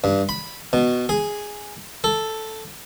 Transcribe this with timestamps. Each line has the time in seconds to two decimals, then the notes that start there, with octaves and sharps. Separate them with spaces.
0.04 G2
0.29 B5
0.73 B2
1.09 G#4
2.04 A4